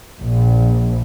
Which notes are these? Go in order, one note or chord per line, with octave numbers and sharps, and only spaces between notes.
A#1